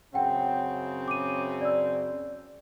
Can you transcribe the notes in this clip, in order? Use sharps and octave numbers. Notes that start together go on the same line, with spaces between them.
F#2 C#3 C4 F#5 G5
D6 D#7
D5 E6